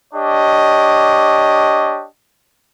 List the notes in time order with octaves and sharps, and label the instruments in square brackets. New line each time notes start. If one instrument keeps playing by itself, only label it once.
[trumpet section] D4 G4 C#5 D#5